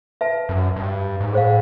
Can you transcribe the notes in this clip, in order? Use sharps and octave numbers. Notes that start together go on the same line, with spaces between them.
B4 E5 A5
F#2
G2
G#2
A2 G#4 C5 F5